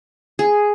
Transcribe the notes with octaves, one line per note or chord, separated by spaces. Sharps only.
G#4